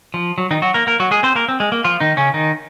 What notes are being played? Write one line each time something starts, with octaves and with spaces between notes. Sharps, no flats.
F3
F#3
D#3 D#4
F#3 F#4
A#3 A#4
A#3 A#4
F#3 F#4
G#3 G#4
C4 C5
A#3 A#4
C4
G#3
A#3
F3 F4
D#3 D#4
C#3 C#4
D#3 D#4